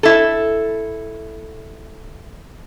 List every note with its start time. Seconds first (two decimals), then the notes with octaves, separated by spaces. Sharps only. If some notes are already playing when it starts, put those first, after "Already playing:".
0.03 E4 A4